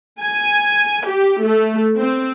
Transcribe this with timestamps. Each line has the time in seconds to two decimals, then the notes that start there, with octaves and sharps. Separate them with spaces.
0.22 G#5
1.07 G4
1.44 A3
1.98 C4